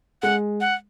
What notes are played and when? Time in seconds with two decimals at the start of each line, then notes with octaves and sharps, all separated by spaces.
0.22 G#3 F#5
0.61 F#5